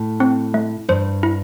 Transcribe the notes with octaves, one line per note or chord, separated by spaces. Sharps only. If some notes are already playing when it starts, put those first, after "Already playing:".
Already playing: A2
C4
A3
G2 C5
E4